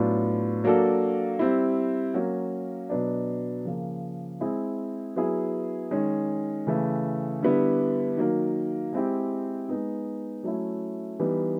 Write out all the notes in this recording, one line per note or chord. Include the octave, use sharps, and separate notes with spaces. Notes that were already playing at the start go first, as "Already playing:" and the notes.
Already playing: A2 F#3 B3 D4 F4
F#3 A#3 D4 F#4 A4
G3 C4 E4
F#3 A#3 C#4 F#4
B2 F#3 B3 D4
C#3 F3 A#3
G#3 C4 E4 G#4
F#3 B3 E4 G#4
D#3 G#3 C#4
C#3 E3 A3
D3 G3 B3 E4
D#3 F#3 A#3
G#3 C4 E4 G4
G#3 B3 D#4
F#3 A3 C#4 E4
E3 G3 B3 D#4